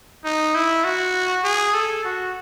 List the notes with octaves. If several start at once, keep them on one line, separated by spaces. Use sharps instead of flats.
D#4
E4
F#4
G#4
A4
F#4